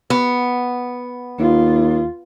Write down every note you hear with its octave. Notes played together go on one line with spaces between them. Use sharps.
B3
D#2 F4